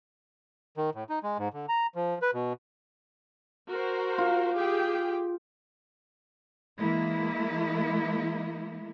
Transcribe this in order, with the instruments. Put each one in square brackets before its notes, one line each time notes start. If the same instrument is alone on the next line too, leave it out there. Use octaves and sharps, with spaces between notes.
[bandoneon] D#3
A2
D#4
G#3
G#2
D3
A#5
F3
B4
B2
[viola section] F#4 A#4 C5
[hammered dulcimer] F4
[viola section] G4 G#4 G5
[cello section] E3 G#3 A#3 E4